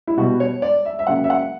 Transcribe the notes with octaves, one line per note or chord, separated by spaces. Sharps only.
E4
B2 G3 B3 F#4
C#5
D5
E5
E5
C#3 F#3 A#3 F#5
E5
F#5